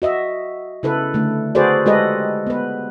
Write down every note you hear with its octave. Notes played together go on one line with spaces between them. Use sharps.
F#4 D#5 E5
C#3 E4 A4 B4
D3 A3
F#4 G#4 A4 B4 C5 D5
G#3 F4 G4 A4 B4 D#5
B3 B4